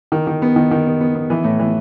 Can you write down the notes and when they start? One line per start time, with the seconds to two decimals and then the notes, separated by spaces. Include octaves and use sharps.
0.12 D#3
0.27 D#3
0.42 B3
0.56 D#3
0.71 D#3
0.86 B3
1.00 B3
1.15 B3
1.30 E3
1.44 A2
1.59 E3